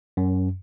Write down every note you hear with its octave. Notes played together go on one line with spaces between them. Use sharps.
F#2